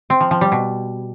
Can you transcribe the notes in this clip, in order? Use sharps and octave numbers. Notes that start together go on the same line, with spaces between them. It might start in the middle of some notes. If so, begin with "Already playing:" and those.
C4
F3
F3
G3
B2